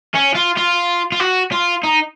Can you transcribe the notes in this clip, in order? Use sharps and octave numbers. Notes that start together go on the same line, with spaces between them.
C#4
F4
F4
F4
F#4
F4
D#4